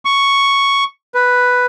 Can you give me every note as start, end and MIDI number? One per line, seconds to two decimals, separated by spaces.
0.05 0.84 85
1.14 1.66 71